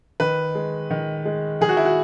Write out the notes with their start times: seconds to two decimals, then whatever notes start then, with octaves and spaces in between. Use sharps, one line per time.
0.20 D#3 B4
0.55 G#3
0.91 D#3
1.25 G#3
1.61 D#3 G#4
1.69 F#4
1.77 E4
1.85 F#4